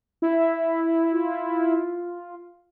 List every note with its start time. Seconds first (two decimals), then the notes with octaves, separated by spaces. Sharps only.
0.22 E4 E5
1.12 F4